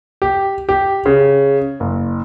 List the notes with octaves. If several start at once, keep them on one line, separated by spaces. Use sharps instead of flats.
G4
G4
C#3
F#1